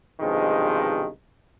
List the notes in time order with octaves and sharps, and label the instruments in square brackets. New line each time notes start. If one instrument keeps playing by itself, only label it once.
[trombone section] B1 G2 C3 D#3 F3 G#3